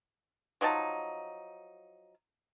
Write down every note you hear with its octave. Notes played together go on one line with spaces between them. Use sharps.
F3 F#3 D#4 A5